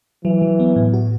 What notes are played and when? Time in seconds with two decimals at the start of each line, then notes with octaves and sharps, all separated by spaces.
0.25 E3 F#3
0.42 F#3
0.60 B3
0.76 A2
0.94 F#4